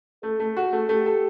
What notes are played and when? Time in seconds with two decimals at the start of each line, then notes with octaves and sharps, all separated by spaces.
0.23 A3 A4
0.40 A3
0.57 F#4 G#4
0.73 A3
0.89 A3 G4
1.06 A4